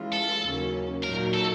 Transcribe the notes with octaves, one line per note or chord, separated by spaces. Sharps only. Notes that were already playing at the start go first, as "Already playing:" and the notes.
Already playing: E3 G#3 C#4 F4
A4
D#2 C#3 F#3 A#3 C#4
A#2 F#3 A#3 D#4 A#4
A4